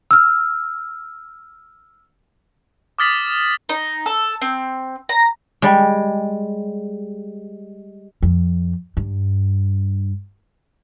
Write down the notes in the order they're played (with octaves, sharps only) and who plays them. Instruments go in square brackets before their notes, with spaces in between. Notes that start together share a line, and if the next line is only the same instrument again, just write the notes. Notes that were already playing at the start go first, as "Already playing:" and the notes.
[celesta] E6 F6
[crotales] D6 D#6 F6 A6 B6 F#7
[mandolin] D#4
A4
C4
A#5
[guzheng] G3 G#3
[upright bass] F2
G2